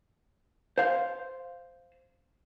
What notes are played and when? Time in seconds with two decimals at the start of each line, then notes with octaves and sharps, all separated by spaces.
0.78 C5 F5